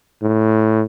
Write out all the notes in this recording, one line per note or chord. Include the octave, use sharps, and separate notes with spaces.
A2